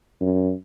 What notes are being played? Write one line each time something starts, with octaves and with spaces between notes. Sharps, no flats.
F#2